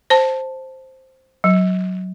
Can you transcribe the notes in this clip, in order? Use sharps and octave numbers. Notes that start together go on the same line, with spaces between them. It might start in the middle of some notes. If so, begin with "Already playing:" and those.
C5 A5
F#3